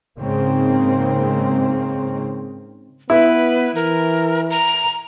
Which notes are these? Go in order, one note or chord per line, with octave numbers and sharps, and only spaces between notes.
G#2 C#3 A#3 C4
B3 E4 B4
E3 A#4
A#5